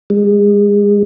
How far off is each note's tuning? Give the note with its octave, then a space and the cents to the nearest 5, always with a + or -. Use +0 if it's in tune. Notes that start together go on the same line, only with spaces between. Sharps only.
G#3 -30